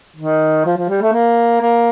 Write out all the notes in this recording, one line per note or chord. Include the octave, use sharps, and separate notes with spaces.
D#3
F3
F3
G3
A3
A#3
A#3